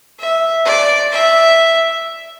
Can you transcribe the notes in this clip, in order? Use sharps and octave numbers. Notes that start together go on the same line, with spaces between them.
E5
D5
E5